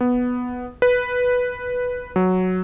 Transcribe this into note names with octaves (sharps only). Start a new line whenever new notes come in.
B3
B4
F#3